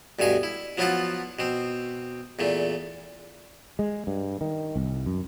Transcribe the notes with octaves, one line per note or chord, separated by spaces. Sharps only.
D2 G2 B2 G#5 C#6
E4
F3 F#3 B3 E4 F4 A5
B2 C4
E2 A#2 A3
G#3
G2
D#3
C2
F#2